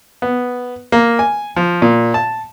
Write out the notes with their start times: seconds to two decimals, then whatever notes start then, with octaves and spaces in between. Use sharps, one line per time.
0.22 B3
0.92 A#3
1.19 G#5
1.56 F3
1.82 A#2
2.14 A5